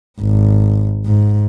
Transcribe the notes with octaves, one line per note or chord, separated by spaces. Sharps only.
G#1
G#2